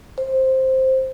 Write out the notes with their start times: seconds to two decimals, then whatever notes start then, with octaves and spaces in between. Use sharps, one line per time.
0.18 C5